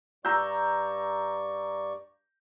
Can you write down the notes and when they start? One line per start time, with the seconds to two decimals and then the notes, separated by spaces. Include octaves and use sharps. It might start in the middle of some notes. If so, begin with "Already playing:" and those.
0.25 G2 D5 A#5 C#6 E6 G6